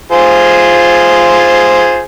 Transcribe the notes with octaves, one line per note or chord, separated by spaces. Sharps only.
F4 G#4 C5